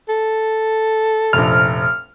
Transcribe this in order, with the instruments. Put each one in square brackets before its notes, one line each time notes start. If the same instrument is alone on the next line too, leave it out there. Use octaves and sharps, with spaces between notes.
[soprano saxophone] A4
[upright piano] F1 A#1 [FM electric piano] F6